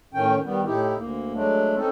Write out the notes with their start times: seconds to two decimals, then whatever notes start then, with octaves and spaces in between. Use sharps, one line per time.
0.14 A2 D#3 C#4 G5
0.44 D#3 G3 B3
0.65 A2 D#4 E4 G4
0.97 D2 A#3
1.33 F#3 G#3 A3 D4
1.76 C4 C#4 D#4 A4